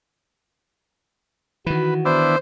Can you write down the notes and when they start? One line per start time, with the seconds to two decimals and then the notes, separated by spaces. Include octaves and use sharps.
1.66 D#3 E3 F#4 B4
2.05 B3 D4 E4 C5